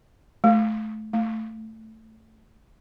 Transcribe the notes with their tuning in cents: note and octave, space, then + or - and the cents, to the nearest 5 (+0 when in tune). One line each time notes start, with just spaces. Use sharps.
A3 -25
A3 +10